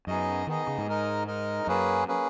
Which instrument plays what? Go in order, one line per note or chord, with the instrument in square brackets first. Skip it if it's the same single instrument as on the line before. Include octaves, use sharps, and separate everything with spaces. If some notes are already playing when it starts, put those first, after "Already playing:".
[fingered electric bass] F#2 [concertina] B3 D#4 G#4 D#5
[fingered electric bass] D#3 [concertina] B3 D#4 G#4 D#5
[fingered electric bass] C#3
G#2
[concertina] G#3 D#4 A#4 D#5
G#3 D#4 A#4 D#5
[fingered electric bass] F#2 [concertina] A#3 C#4 G#4 B4
[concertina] A#3 C#4 G#4 B4